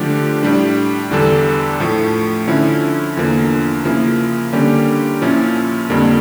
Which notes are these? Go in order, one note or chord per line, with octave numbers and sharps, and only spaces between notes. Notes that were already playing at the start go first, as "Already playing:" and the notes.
Already playing: D3 F3 A3 D4 G4
A2 G3 D4
E2 D3 G3 D4 A4
A2 F3 A3
D3 F3 C#4 E4
E2 D3 F3 A#3
C#3 F3 A#3 E4
D3 G3 A#3 C#4 G4
A#2 F3 C#4 E4
F2 D3 G3 A#3